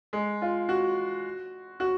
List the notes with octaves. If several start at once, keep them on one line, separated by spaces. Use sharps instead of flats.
G#3
F4
F#4
F#4